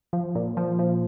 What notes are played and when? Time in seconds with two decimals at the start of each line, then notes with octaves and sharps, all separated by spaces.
0.13 F3
0.35 A#2
0.57 F3
0.79 F3